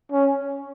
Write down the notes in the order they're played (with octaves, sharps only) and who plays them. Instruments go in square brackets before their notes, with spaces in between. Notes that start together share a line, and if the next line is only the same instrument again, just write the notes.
[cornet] C#4